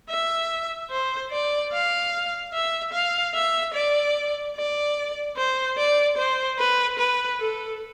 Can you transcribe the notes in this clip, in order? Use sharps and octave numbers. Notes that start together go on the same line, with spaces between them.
E5
C5
D5
F5
E5
F5
E5
D5
D5
C5
D5
C5
B4
B4
A4